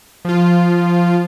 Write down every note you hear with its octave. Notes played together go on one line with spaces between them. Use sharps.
F3 F4